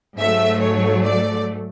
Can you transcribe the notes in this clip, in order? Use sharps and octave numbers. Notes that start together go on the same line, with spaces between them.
G#2 F#3 A3 E5
C#5
D5